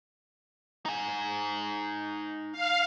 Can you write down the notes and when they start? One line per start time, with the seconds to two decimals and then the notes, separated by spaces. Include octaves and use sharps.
0.85 D#4 G#5
2.52 F5